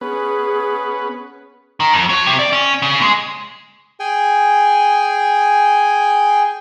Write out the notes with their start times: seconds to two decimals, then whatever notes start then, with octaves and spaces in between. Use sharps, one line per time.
0.01 B3 C#4 G#4 B4
1.80 D#3
1.93 F2
2.09 F#3
2.26 C3
2.39 D5
2.53 C#4
2.82 C#3
3.01 G#3
4.00 G#4 G5 G#5